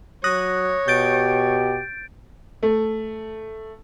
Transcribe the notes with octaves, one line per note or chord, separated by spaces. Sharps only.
F#3 C#5 D#6 F#6 A#6
B2 G4 G6 A6 D7
A3